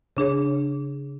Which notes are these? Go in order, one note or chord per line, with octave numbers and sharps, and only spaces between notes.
C#3 D4 G#4 C#5